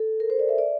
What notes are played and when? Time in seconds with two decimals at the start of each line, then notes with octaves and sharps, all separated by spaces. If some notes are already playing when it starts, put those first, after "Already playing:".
Already playing: A4
0.20 A#4
0.30 C5
0.39 D5
0.49 E5
0.58 D5